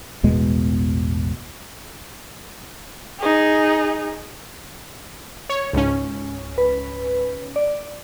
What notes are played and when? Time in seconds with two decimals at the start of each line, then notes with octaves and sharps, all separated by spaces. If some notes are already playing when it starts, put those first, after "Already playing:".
0.23 A1 E2 B2 G#3
3.20 D#4 G#4
5.49 C#5
5.73 C#2 G#2 C#4
6.58 B4
7.56 D5